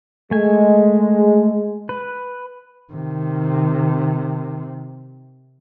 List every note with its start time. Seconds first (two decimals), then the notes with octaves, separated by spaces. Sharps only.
0.31 G#3 A3 G#5
1.89 B4
2.93 C3 D#3